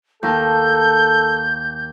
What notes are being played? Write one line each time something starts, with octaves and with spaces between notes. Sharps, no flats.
D#2 A4 A#4 A5 G6